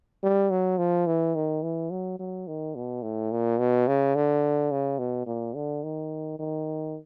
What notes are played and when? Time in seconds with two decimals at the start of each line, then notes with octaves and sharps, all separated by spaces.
0.23 G3
0.51 F#3
0.78 F3
1.07 E3
1.35 D#3
1.63 E3
1.91 F#3
2.19 F#3
2.48 D#3
2.76 B2
3.03 A2
3.32 A#2
3.59 B2
3.88 C#3
4.15 D3
4.72 C#3
4.99 B2
5.27 A#2
5.55 D3
5.84 D#3
6.39 D#3